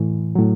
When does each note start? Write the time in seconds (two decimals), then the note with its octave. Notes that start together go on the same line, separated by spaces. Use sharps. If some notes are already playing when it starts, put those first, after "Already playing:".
Already playing: A2 E3
0.35 A2 F#3